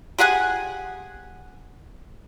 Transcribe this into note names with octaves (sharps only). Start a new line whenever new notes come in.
G4 G#4 F#5 G#5